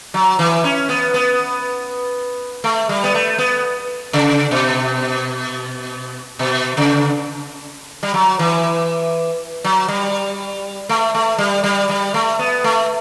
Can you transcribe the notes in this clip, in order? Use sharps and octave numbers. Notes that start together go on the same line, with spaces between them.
F#3
E3
C#4
B3
B3
A3
G3
B3
A3
B3
C#3
B2
B2
C#3
G3
F#3
E3
F#3
G3
A3
A3
G3
G3
G3
A3
B3
A3